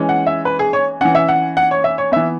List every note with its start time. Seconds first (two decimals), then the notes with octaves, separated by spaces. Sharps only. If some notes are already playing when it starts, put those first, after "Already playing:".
Already playing: E3 G#3 C#4
0.09 F#5
0.27 E5
0.45 B4
0.59 G#4
0.73 C#5
1.01 E3 C#4 F#5
1.15 E5
1.28 F#5
1.57 F#5
1.71 C#5
1.84 E5
1.98 C#5
2.12 E3 B3 E5